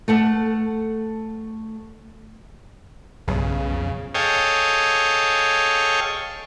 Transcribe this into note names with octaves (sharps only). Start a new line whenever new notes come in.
A3 A4 F#5
B1 G2 C#3
F2
G#4 A4 C#5 D#5 F5 G5